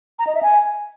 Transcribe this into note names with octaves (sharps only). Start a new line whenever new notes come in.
A#5
D#5
E5
G#5